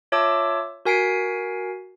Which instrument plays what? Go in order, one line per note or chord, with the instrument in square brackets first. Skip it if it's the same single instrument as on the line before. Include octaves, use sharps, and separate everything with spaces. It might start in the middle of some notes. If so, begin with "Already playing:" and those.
[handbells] F4 C#5 E5 A5 D6 E6
F#4 A#4 G#5 B6 C7 D7